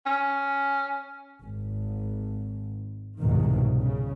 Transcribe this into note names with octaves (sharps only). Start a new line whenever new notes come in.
C#4
G#1
C2 F2 G#2 B2 D#3
C#3